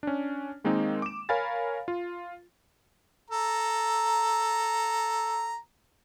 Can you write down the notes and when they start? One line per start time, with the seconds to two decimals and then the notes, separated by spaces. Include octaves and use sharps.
0.03 C#4 D4
0.64 D#3 G#3 A#3 C4 D#4
1.02 D6 E7
1.29 A#4 C#5 F5 G#5 B5 A6
1.88 F4
3.31 A4 A#5